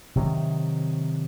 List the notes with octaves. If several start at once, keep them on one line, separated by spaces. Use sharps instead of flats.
C3 D#3 F#3